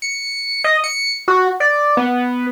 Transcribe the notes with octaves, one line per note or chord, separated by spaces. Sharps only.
C#7
D#5
C#7
F#4
D5
B3